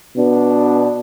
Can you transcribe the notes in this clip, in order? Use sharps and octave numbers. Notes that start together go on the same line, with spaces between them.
B2 B3 D4